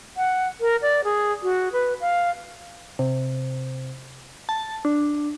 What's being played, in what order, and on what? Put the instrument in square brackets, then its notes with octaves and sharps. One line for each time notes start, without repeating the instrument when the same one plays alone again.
[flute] F#5
A#4
D5
G#4
F#4
B4
F5
[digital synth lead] C3
A5
D4